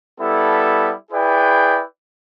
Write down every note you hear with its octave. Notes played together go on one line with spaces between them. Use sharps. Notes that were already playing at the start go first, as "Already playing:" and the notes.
G3 B3 E4 A4
E4 G#4 B4 D5 G5